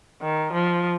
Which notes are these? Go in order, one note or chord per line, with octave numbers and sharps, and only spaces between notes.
D#3
F3